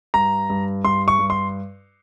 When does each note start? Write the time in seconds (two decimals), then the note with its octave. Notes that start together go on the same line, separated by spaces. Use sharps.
0.14 G2 A#5
0.50 G2
0.84 G2 C6
1.08 C#6
1.19 G2
1.30 C6